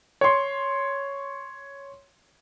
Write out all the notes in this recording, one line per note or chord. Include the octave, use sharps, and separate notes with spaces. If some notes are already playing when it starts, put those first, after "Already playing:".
C#5 C6